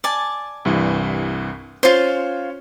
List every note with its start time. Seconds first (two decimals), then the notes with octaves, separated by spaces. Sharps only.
0.04 D5 G#5 A5
0.65 C2 G2 E3
1.83 C#4 F4 C5 C#5